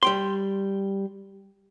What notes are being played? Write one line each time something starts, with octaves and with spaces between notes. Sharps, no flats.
G3 G5 C6